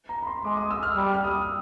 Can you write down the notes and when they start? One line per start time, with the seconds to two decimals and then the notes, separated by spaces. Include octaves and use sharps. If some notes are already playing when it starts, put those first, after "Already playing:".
0.09 A#5
0.23 B5
0.27 C6
0.44 G#3 D6
0.57 D#6
0.71 E6
0.83 F6
0.96 G3
1.14 F6
1.24 D#6
1.31 E6